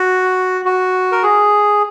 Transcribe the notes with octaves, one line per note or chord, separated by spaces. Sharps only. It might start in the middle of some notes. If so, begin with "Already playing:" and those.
Already playing: F#4
F#4
A#4
G#4